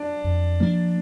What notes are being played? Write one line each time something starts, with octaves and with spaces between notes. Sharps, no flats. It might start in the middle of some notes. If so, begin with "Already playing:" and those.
Already playing: D4
F2
F3 A#3 D4